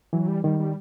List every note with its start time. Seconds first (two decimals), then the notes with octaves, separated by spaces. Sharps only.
0.13 E3 F#3
0.28 G3
0.44 D#3 G3
0.59 G3